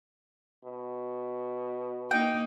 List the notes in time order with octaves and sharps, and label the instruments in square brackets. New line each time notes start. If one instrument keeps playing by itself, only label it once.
[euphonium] B2
[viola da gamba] A#3 D#4 [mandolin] G5